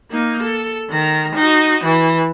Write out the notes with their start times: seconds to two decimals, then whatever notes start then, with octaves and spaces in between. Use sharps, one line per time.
0.11 A#3 D#4
0.43 A4
0.90 D#3 A#5
1.35 D#4 F#4
1.84 E3